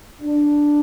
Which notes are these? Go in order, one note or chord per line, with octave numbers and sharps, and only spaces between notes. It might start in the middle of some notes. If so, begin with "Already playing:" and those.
D4